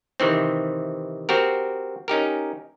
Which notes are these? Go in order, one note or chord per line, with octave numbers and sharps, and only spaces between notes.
C3 D#3 E3 C4
C4 F#4 G4 A#4
C#4 D#4 G4 A#4